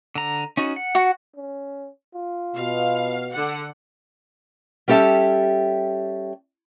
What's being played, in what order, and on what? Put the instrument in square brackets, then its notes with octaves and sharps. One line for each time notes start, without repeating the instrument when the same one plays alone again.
[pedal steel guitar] D3 A#5
C#4 D#4 F#4
F#5
[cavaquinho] F#4
[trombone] C#4
F4
[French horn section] B2 [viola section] F5
[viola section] D3 F#5
[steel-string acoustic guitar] G3 C#4 G4 A4 E5